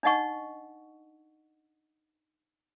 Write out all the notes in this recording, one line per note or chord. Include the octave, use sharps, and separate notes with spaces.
D4 D#4 D#5 F#5 C#6